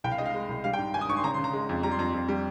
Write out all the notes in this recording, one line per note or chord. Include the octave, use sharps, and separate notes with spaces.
C2 G5
F5
G#3 D#5
F5
G#3
C2
G3 F5
G5
G#2
G#1 G#5
D#6
G#1 C#6
C6
C#3 A#5
C6
C#3
A#5
G#3
F2
G3 A#5
C6
F2 A#5
F2
G3